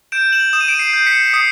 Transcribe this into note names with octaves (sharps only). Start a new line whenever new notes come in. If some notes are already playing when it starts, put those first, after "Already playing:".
G6 D7 E7
E7 F#7
D#6 E7
D#7
D7 E7
D#7
C7 D7
G6
B6 C#7
C#7
D#6 C7